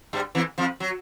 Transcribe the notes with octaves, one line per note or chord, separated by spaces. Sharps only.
G2 G3
E2 E3
F2 F3
F#3